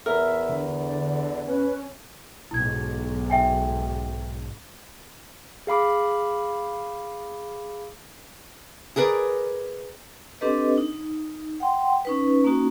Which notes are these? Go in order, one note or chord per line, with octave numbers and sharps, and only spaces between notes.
E2 A#4 E5
D3
D5
C#4 B4
B1 G#2 E4 G#6
E5 G5 G#5
G#4 F5 B5 D6
G#4 A#4 B4 D5
C4 D4 G4 A4 B4 D#5
D#4
F#5 G5 C6
C#4 D#4 B4
A#3 C#4 D#4 F#4